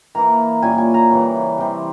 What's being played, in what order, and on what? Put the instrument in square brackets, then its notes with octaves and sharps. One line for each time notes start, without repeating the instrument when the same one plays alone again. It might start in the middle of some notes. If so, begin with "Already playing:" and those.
[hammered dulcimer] E3 A#3 E4 A#5
A#2 G3 C#4 E4 G#5
G#5
A#5
C#3 E3 G3 C#4
C3 E3 G3 C4